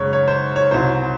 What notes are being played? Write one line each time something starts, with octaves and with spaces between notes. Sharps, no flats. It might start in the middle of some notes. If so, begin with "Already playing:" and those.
Already playing: F#2 C#3 G#3 C#5
C#5
C5
C#5
C2 C3 F#3 C4 C5